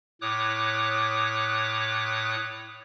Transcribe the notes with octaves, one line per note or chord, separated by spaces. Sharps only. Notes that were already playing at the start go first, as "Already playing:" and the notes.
A2 C#5 D6 D#6 F#6